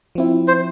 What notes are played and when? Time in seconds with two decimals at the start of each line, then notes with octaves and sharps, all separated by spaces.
0.15 F3 C4 E4
0.48 C5